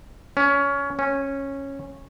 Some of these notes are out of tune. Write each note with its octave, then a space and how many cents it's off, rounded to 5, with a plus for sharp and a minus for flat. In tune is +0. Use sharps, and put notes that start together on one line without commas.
C#4 +20
C#4 -10